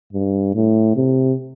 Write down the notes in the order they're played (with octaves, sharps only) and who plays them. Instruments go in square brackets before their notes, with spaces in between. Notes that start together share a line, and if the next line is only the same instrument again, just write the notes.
[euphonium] G2
A2
C3